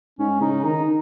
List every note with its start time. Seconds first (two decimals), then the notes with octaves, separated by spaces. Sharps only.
0.19 G#2 C#4
0.41 C#3 D#4
0.64 D#3 D#4